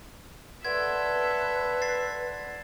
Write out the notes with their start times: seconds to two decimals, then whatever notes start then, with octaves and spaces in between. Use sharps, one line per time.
0.65 A4 B4 D5 E5 F#5 C6 G#6
1.82 A6 C7